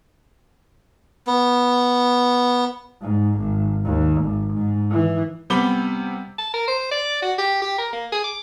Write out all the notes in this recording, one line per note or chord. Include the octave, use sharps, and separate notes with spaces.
B3
G#2
G#1
D#2
G#1
G#2
E3
C3 G3 B3 B5 D6 G7
A5
A#4
C5
D5
F#4
G4
G4
A#4
A#3
G#4
D6